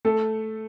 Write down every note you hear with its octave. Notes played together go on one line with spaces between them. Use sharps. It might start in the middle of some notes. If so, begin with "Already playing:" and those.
A3 A4